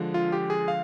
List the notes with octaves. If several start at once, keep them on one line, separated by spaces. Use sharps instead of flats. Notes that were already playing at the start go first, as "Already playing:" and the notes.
Already playing: D3 F3 G#3
F4
G4
G#4
F5